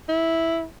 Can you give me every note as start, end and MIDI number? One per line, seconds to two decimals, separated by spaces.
0.09 0.65 64